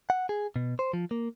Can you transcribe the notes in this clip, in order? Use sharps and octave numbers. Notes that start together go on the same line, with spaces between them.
F#5
G#4
B2
C5
F3
A#3